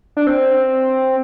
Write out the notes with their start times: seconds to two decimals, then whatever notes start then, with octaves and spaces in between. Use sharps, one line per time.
0.17 D4
0.27 C4